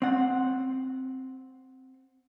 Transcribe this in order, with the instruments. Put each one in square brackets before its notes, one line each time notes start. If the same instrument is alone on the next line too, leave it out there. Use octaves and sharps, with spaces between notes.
[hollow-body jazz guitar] C4 F#5